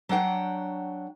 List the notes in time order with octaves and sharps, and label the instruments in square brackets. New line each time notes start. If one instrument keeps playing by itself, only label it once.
[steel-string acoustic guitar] F#3 D4 F#5 G5